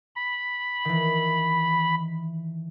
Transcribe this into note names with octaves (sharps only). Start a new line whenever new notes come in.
B5
D#3 E3